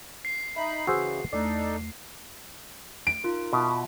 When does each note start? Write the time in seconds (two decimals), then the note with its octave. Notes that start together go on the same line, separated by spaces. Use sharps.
0.25 C7
0.56 D#4 E5 B5
0.87 C#3 E3 F#4 G#4 C5 E6
1.33 E2 A3 D4 D#4 A4 D5
3.07 D7
3.24 D#4 F4 A#4
3.53 B2 F4 E5 A5